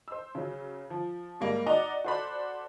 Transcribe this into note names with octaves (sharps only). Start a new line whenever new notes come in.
C5 E6
C#3 F#3
F3
G#2 G3 A#3
D#4 F#4 D5 D#5 F#5 A#5
F#4 A4 C5 D5 B5 F#6